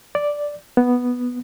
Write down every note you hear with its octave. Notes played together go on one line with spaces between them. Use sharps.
D5
B3